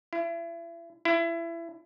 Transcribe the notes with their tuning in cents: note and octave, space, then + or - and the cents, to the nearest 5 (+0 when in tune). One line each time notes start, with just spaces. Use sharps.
E4 +35
E4 +25